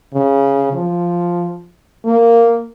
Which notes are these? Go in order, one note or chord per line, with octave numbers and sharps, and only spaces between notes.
C#3
F3
A#3